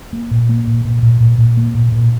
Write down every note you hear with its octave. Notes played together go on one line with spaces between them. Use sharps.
A#3
A#2
A#3
A#2
A#2
A#2
A#2
A#2
A#3
A#2
A#2